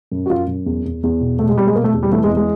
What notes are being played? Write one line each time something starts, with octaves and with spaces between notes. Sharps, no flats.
F#2
F#4
F#2 F4
F#2
E2
E2
E2
B2
B2 A3
G#3
B2 G3
G#3
B2 A#3
A3
E2
G3
E3 A3
G#3
E2
G#3